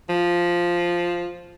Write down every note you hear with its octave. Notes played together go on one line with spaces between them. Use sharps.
F3